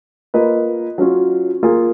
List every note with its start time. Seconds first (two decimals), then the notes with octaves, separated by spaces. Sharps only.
0.34 A#3 F4 B4 D#5
0.98 F#3 C#4 F4
1.63 A#3 F4 G#4